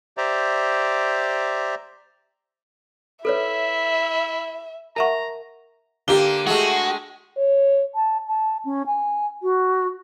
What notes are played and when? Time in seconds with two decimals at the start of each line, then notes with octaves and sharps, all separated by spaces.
0.17 G4 C5 D5 E5 A#5
3.25 E4 A4 B4 C#5 E5
4.96 A#4 E5 F#5 A5 A#5 C#6
6.08 D3 A#3 G4 G7
6.47 G#3 A3 F#4
7.38 C#5
7.95 A5
8.27 A5
8.65 C#4
8.87 G#5
9.43 F#4